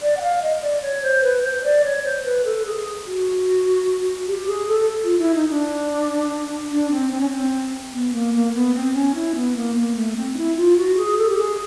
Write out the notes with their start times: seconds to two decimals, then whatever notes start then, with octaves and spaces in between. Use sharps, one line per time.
0.02 D5
0.17 F#5
0.22 F5
0.42 D#5
0.62 D5
0.82 C#5
1.03 C5
1.23 B4
1.43 C5
1.64 D5
1.85 C#5
2.04 C5
2.24 B4
2.45 A4
2.66 G#4
3.06 F#4
4.28 G4
4.48 G#4
4.68 A4
5.04 F4
5.19 E4
5.34 D#4
5.49 D4
6.71 D4
6.91 C4
7.11 C4
7.20 C#4
7.30 C4
7.93 B3
8.13 A#3
8.34 A#3
8.54 B3
8.75 C4
8.94 C#4
9.15 E4
9.35 B3
9.56 A#3
9.75 A#3
9.95 A3
10.17 C4
10.37 E4
10.56 F4
10.77 F#4
10.97 G#4
11.18 A4
11.30 G4
11.38 G#4